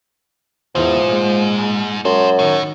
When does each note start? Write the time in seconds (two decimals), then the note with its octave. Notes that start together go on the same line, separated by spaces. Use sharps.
0.75 E2 G#2 F3
1.04 A#2 G#3
2.05 F#2 A4 C5
2.39 A2 D#3